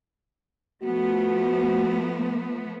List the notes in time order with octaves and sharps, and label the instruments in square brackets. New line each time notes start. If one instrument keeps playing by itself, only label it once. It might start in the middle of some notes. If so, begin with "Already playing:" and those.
[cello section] F3 A3 B3 [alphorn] F#4